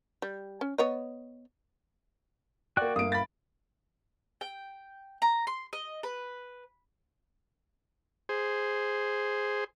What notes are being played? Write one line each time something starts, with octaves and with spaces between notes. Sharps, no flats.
G3
C#4
B3 C#5 D#5
A#3 F#4 D5 G5 F#6
G1 A#3 F5 D#6 D7
B5 A6
G5
A#5
C6
D#5
B4
G#4 C5